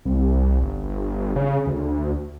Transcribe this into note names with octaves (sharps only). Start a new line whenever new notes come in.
C2
G1
C#3
D2